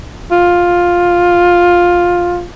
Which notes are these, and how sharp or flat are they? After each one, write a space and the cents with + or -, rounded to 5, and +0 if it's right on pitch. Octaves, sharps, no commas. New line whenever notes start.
F4 +10